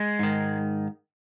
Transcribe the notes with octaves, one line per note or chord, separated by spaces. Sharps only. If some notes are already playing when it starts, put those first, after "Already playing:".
Already playing: G#3
G#2 D#3